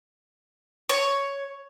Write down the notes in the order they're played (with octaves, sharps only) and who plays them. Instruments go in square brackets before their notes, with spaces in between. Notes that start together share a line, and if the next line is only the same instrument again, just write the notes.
[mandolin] C#5